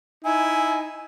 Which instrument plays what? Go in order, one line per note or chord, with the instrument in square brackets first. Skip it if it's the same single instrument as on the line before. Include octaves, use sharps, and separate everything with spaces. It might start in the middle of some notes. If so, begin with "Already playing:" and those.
[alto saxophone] D#4 [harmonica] E4 [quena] G#5